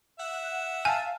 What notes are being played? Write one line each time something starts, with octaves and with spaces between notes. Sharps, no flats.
E5 F#5
F5 G#5 A5